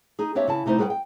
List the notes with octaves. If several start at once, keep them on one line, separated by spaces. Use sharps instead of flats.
D#4 G#4
A#3 C4 D4 G4 C#5 E5
C#3 E4 A5
C3 A3 D#4 E4 C5
G3 G#4 B4 C#5 F#5 G5
G5